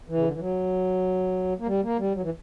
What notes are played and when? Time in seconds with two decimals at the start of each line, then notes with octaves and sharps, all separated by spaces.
0.08 E3
0.17 C#3
0.25 D3
0.33 E3
0.39 F#3
1.59 A#3
1.66 G3
1.83 A#3
1.99 G3
2.14 F#3
2.22 E3